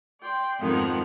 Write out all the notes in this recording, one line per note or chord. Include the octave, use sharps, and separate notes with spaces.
D5 G5 C6
F2 G#2 D#3 F3 G#3 B3